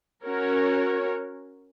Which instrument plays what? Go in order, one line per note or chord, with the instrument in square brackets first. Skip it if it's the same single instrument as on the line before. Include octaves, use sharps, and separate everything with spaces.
[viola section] C#4 F#4 A#4 C#5